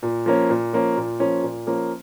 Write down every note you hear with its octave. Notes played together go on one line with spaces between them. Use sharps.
A#2
F3 A#3 C#4
A#2
F3 A#3 C#4
A#2
F3 A#3 C#4
A#2
F3 A#3 C#4